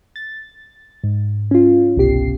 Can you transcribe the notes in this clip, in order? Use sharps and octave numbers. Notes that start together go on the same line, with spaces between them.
A6
G#2
C#4 F4
G1 C2 B2 G4 C7